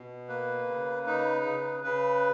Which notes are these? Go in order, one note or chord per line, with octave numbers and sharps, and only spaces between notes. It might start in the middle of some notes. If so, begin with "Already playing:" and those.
Already playing: B2
A#3 B4
C#3
D#4 B4
C#3
C#3 B4